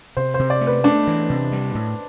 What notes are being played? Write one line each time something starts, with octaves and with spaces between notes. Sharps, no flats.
C3 C5
C5
C3
D5
A3
B4
A3 D4
E3
C3
G3
A2